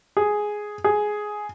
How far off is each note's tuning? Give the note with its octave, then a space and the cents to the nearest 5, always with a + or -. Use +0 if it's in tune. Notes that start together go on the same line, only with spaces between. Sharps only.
G#4 +5
G#4 +10